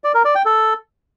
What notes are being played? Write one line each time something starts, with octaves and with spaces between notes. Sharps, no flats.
D5
A#4
D5
G5
A4